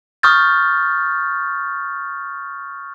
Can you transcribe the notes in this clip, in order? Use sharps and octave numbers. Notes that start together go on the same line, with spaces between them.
C#6 D#6 F6 G6 A6